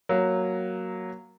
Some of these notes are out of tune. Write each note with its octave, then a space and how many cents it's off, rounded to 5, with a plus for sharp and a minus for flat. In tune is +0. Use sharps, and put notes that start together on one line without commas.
F#3 +0 A#3 +0